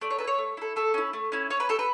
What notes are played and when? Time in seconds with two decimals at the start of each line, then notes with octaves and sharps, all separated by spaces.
0.01 A3 D5
0.10 C#5
0.18 A4 B4
0.24 E4 C#5
0.38 A3
0.57 E4 A4
0.76 A3 A4
0.94 C#4 E4
1.13 A3
1.32 C#4 E4
1.50 C#4 C#5
1.60 B4
1.69 G4 A4
1.79 B4